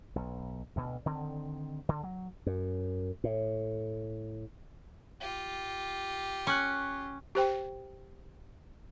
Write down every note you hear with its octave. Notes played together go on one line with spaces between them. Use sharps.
B1
D2 B2
D3 D#3 C4
D3
F#3
F#2
A2
F4 G4
C#4 C#6 F#6
G4 C5 G5